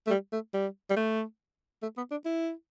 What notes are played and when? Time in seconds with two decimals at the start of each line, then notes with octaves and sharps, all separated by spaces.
0.07 A3
0.10 G3
0.32 A3
0.54 G3
0.90 G3
0.97 A3
1.82 A3
1.97 B3
2.11 D4
2.25 E4